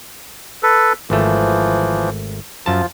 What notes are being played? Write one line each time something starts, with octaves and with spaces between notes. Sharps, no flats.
A4 B4
G#1 E3 F3 A3
F#2 F3 F4 A5